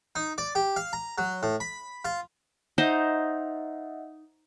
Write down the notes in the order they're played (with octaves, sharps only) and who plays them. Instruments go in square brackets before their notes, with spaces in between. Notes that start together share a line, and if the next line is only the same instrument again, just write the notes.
[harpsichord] D#4
D5
G4
F5
A#5
F#3
A2
B5
F4
[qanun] D#4 C5 [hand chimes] D#5 E5 F#5